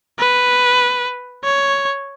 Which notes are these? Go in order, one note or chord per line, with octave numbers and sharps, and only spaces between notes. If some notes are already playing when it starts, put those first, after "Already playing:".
B4
C#5